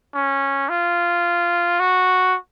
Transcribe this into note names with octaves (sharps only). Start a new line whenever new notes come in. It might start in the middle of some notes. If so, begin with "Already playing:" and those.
C#4
F4
F#4